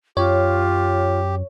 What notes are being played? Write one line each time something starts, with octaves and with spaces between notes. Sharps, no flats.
F#2 F4 G4 C#5